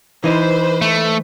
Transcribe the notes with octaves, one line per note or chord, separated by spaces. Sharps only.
E3 D#4 B4 C5 B5
A3